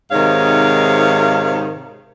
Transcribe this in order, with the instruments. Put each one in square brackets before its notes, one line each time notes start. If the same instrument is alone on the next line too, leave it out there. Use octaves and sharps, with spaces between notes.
[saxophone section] G#2 C3 D#3 D#4 C#5 F5